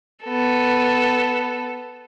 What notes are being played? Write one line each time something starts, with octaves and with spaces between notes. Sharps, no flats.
B3 A4